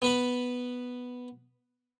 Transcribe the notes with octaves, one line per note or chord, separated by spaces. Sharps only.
B3 B4 B5